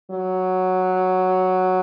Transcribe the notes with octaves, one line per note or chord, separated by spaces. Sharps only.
F#3